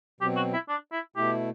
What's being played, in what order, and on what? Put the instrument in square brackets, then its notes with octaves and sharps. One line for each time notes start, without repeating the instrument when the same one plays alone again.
[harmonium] B2 F#3 C4 [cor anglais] G4
[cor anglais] F#4
E4
D4
E4
[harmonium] B2 A3 E4 [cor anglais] G4